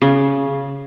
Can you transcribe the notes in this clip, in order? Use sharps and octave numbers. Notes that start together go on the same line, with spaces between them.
C#3